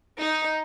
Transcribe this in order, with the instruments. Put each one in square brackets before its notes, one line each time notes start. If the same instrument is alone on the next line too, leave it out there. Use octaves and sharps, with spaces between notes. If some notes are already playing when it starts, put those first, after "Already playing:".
[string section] D#4